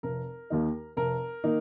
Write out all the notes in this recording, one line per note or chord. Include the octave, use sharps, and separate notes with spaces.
F1 A#4
D#2 D#3 A#3 D#4
F1 A#4
D#3 A#3 D#4